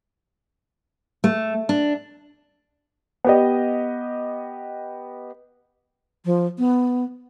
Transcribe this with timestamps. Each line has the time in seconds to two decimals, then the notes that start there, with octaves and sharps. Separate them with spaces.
1.24 A3
1.69 D4
3.24 B3 G4 D#5
6.25 F3
6.58 B3